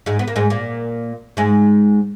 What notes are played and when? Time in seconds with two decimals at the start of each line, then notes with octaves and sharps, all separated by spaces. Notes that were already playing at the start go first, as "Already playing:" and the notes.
0.06 G#2 G#3
0.19 B3
0.27 A#3
0.36 G#2 G#3
0.50 A#2 A#3
1.37 G#2 G#3